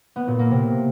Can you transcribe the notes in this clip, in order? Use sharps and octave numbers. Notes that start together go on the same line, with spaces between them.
B3
A#2
A#3
C3